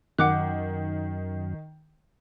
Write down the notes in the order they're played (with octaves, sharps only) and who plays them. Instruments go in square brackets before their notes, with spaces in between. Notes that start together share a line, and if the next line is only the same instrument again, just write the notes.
[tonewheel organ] F#2 [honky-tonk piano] D#3 [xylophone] F#5 D6 F#6